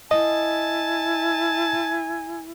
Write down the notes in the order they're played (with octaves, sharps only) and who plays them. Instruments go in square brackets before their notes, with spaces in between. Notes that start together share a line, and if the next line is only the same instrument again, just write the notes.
[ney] E4 [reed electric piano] D#5 [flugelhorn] G#5 [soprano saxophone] A5